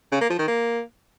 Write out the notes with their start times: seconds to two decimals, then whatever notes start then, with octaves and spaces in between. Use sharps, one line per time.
0.12 C#3
0.21 A#3
0.30 F3
0.39 D#3
0.47 A#3